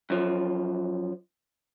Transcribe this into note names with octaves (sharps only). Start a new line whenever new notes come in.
F#2 F3